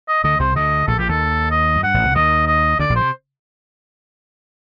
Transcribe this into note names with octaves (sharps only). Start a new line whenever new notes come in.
D#5
D2 D3 D#5
C2 C3 C5
D2 D3 D#5
A#1 A#2 A4
A#1 A#2 G4
D#2 D#3 A4
D#5
F#2
G2 F#5
A1 A2
C2 C3
D#2 D#3 D#5
D#5
D2 D3 D5
A#1 A#2
C5
C3